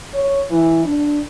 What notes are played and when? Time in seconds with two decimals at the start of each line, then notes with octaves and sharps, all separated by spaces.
0.14 C#5
0.50 E3
0.84 D4